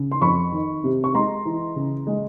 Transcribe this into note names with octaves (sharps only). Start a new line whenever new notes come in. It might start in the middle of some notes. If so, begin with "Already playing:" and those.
Already playing: C#3
C6
F2 B5 C#6
D#3
C3
C#6
G#3 A#5 C6
E3
C#3
G#3